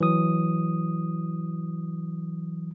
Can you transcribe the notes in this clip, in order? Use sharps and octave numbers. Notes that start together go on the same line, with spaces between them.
E3 F#3 D#6